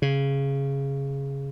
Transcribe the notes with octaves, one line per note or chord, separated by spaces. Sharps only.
C#3